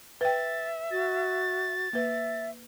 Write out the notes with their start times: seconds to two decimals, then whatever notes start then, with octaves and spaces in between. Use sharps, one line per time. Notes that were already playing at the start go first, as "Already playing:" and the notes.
0.21 B4 E5 G5 A6
0.91 F#4 A6
1.93 A#3 B4 E5